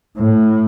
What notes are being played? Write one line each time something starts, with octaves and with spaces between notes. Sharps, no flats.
A2